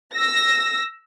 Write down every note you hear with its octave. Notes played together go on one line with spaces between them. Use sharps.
E6 A#6